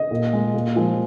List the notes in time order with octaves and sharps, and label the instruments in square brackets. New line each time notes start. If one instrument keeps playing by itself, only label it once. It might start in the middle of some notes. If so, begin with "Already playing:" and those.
Already playing: [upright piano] D#5
A#2
G#3
A#2
F3 G#3